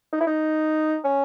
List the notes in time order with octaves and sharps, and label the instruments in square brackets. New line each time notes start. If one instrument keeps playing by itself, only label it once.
[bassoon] D#4
E4
D#4
C#4